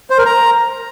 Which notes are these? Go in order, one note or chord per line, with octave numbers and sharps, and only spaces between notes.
C5
A#4
A#5